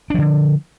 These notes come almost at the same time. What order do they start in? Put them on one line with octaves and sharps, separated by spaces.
D4 F3 D3